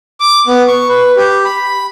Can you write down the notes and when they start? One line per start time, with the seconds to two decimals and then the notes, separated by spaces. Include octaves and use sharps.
0.20 D6
0.47 B3
0.68 C#6
0.89 B4
1.17 G4
1.45 B5